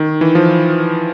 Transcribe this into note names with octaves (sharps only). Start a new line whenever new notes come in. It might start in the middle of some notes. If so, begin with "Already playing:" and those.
Already playing: D#3
E3
F3